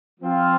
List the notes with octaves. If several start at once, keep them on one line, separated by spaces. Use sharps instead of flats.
F3 C4 F4